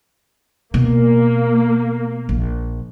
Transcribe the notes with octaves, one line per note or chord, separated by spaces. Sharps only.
B2 A#3
A#1